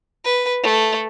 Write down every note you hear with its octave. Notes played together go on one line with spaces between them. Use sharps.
B4
A3